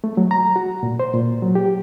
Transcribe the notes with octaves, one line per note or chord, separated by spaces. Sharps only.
A3
F#3
A#5
F#4
A#2
C5
A#2
F#3
G4